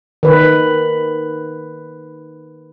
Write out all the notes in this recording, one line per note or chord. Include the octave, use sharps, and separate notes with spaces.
D#3 B4